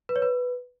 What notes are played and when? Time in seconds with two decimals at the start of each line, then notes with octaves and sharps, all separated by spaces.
0.09 B4
0.16 C#5
0.22 B4